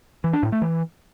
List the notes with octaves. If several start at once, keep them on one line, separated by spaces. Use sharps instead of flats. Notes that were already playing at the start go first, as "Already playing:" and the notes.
E3
D4
A2
A3
E3